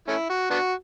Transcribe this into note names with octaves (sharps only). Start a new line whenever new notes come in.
A3 C#4 E4
F#4
B3 D4 F#4